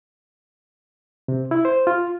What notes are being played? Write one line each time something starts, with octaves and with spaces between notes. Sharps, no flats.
C3
E4
C5
F4